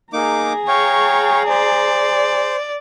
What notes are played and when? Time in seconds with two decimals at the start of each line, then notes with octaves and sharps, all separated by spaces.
0.13 A#3 D#4 G#4 A#5 D6
0.68 C#5 F5 G5 C#6
1.49 C5 D5